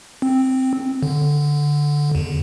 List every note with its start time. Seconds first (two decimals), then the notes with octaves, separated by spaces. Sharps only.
0.22 C4
1.03 D3
2.15 E2